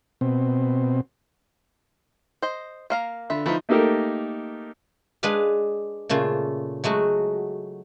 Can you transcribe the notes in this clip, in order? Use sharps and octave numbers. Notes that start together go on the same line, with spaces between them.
B2 C4
C5 D#5
A#3 F5 A#5
D3 F4 B4 E5
F3 A3 D#4 E4 B4
A3 A#3 D#4 G4 A4 A#4
G#3 D4 B4 F5
A#2 C#3 A3 F4
F#3 G#3 A3 F#4